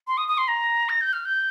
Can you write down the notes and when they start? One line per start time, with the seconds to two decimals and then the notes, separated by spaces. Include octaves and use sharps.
0.07 C6
0.17 D#6
0.28 D#6
0.38 C6
0.48 A#5
0.89 A#6
1.01 G6
1.13 F6
1.25 G6